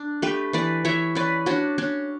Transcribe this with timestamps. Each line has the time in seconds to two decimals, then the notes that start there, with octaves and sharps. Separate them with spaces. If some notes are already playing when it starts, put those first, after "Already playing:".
Already playing: D4
0.22 A3 G4 B4
0.53 E3 B4 D5
0.85 E3 C#5 E5
1.15 C#4 B4 D5
1.46 C#4 D4 F#4
1.78 C#4 D4